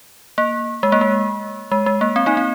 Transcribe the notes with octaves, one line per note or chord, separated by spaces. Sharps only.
A#3
G#3
A#3
G#3
G#3
G#3
A#3
C4
A#3 D#4
C4